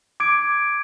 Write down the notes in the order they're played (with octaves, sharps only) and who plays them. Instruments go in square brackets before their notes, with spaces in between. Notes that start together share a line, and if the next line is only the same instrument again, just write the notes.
[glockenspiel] D6 G#6 D7